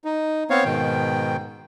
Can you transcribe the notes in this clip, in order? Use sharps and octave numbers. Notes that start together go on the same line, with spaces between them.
D#4
B3 C4 C#5 F5
G#2 B2 D#3 G5